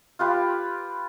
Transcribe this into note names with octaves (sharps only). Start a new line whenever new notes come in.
F4 G4 B4 F5